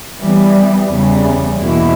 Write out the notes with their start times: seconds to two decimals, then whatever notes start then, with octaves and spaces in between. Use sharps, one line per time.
0.21 E3 G3 B3
0.90 E2 C#3 G3
1.58 E2 B2 A#3 E4